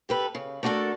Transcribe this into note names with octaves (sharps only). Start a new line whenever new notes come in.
G4 A4 B4
C#3
A3 D4 F#4 G4 A4 A#4